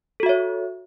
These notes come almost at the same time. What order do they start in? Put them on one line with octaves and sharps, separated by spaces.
A4 F#4 E5 C#5